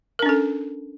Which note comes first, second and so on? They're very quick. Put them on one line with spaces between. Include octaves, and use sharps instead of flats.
A#4 D4 C#4 A4